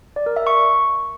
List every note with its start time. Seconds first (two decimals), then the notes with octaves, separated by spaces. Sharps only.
0.16 D5
0.26 A#4
0.36 E5
0.47 C#6